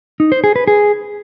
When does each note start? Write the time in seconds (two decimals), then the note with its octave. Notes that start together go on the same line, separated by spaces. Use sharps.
0.20 D#4
0.32 C5
0.44 G#4
0.56 B4
0.68 G#4